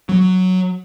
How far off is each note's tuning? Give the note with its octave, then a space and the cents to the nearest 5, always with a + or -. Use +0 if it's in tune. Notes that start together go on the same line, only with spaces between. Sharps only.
F#3 +0